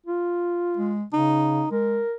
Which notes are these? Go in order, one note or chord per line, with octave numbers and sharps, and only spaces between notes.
F4
G#3
C#3 D#4
G#3 A#4